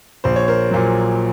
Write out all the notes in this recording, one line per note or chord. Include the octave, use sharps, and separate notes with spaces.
A#1 C5
C#5
A#4 C5
A#2 F#3